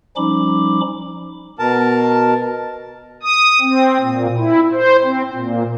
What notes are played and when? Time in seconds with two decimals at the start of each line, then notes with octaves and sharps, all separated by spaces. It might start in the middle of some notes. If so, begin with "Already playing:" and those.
0.16 F3 G3 C#4 D#4 B5 D6
1.59 B2 A#4 A5
3.23 D#6
3.61 C4
4.01 A#2
4.37 E4
4.73 C5
5.03 C4
5.32 A#2